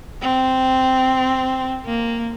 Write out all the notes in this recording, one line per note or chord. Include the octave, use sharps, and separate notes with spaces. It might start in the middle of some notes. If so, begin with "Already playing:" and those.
C4
A#3